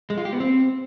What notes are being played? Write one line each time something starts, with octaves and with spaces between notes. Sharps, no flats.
G#3
F4
G4
B3
C4